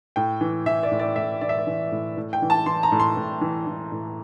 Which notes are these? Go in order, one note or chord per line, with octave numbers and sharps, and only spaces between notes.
A2 G5
E3
E3 E5
D5
A2
D5
A2 E5
E3 D5
E5
D5
E3
A2
A2
G5
E3
A5
E3 C6
A#5
A2
C6
A2
E3
E3
A2